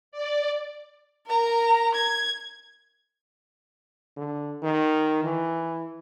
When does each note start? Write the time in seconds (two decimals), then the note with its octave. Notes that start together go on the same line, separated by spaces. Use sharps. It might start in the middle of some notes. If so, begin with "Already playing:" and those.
0.12 D5
1.27 A#4 A#5
1.95 G#6
4.17 D3
4.63 D#3
5.24 E3